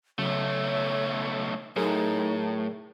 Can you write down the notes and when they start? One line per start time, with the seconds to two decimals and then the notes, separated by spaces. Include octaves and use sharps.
0.19 B1 C#3 F#3 A3 C#5
1.76 A2 F#3 D#4 G#4 A#4